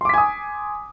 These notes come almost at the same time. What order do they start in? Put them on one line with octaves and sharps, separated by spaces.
C6 D6 B6 G#5 D#6